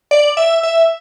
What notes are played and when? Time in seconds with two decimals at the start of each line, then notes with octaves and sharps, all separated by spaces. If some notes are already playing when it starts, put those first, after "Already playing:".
0.11 D5
0.37 E5
0.63 E5